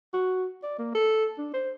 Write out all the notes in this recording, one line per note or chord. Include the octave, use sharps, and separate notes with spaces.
F#4
D5
A#3
A4
D4
C5